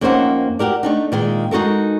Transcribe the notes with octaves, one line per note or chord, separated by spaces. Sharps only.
F2 A#3 C#4 D#4 C5 F#5
F#4 G4 A#4 D5
A3 D4 D#4
A#2 D#3 G#3 A#3
G#3 D#4 F#4 A4 A#4